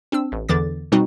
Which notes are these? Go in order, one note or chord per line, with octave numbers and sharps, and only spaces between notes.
C4 D4 E6
A1
E2 D3 E3 D6 A6
B2 G3 C4 D#4 F#4